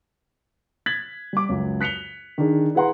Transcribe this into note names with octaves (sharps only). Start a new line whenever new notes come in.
G#6 A6 B6 F#7
G3 D6
C#2 F#2
F#6 B6 C#7 F7 G7
D#3 D4 G#4
E4 G#4 B4 F#5 A#5 C6